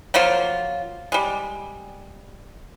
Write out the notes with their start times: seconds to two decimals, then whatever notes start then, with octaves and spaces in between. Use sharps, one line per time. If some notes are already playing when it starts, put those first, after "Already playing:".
0.14 F3 F#3 A#3 F4
1.12 G3 G#3